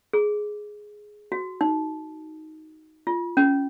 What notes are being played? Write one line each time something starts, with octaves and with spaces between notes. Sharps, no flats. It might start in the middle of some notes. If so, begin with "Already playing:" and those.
G#4
F#4
D#4
F4
C#4